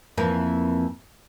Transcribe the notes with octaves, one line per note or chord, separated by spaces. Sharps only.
F2 E3 A#3